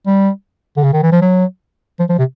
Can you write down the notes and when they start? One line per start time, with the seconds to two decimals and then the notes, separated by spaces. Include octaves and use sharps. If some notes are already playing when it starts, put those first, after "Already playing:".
0.06 G3
0.77 D3
0.84 C#3
0.93 D#3
1.03 E3
1.12 F3
1.22 F#3
1.99 F3
2.09 F3
2.19 C3